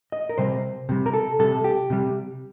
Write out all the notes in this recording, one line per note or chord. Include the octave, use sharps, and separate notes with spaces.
D#5
A#4
C3 G3 C5
C3 G3
A#4
A4
C3 G3 A4
G4
C3 G3